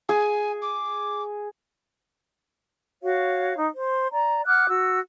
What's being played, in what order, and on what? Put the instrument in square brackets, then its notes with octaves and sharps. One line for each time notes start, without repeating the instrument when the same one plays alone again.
[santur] G#4 [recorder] G#5
[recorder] D6
[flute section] F#4 C#5 F5
D#4
C5
D5 A#5
F#5 D6 F6 F#6
F#4 E6